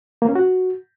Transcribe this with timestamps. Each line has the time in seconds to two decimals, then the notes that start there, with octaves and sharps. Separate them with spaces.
0.22 A#3
0.29 C#4
0.35 F#4